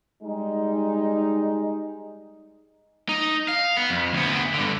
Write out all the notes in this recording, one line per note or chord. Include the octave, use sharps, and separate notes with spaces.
G3 G#3 D#4
D#4
F5
B3
F2
D2 B3
G2 D3